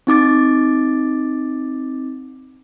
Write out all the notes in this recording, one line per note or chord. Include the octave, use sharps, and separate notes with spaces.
C4 D#4 D6 A6